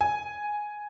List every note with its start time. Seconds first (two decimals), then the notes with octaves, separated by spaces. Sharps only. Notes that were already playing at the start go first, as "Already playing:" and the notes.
0.01 G#5